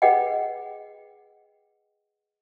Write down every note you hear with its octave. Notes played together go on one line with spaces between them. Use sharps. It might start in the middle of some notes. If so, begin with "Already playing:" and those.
G#4 B4 D#5 F#5 G5